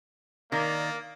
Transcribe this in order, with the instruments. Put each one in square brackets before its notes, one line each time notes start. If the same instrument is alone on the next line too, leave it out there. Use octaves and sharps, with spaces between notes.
[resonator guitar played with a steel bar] D#3 [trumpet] A#3 [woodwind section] D5